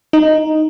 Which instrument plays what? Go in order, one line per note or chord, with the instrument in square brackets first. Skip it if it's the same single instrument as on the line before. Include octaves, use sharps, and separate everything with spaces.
[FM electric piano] D#4